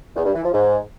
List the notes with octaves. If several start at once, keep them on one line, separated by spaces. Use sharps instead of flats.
E2
G2
E3
F3
G#2